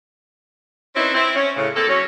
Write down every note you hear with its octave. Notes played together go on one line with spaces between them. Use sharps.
C4 C#4 D#4 E4 B4
C4 E4
C#4
A2 C#3
A#3 C4 A4
F#3 C#4